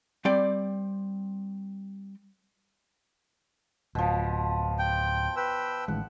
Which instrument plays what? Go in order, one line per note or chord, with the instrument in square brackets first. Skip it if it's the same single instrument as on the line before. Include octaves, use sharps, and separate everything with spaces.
[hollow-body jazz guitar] G3 C4 D5 G5
[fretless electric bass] D1 [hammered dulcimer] B2 F3
[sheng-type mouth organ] G5
B4 G5 E6
[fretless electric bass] A1 D#3 G#3 [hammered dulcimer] F#5